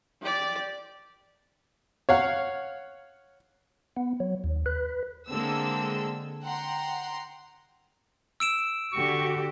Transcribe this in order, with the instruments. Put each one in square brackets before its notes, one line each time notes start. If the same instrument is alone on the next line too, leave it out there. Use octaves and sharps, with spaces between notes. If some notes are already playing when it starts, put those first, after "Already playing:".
[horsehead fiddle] G4 D5
[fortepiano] C#5 F5 F#5
[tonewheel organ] B3
F#3
D#2
B4
[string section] D3 G#3 A#3 C4 A4 E6
F#5 G5 A#5 C6
[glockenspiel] E6 D7 E7
[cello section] D3 F#4 G4 [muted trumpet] C#6